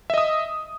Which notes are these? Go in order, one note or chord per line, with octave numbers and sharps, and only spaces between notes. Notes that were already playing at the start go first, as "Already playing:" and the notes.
D#5 E5 D#6